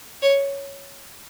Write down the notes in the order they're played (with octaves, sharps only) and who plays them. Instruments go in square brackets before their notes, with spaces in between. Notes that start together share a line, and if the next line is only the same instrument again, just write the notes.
[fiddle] C#5